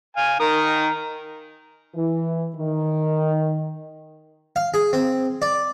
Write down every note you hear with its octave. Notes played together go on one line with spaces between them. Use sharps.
F5 G#5
D#3 A#4 D#6
E3
D#3
F5
G#4
C4
D5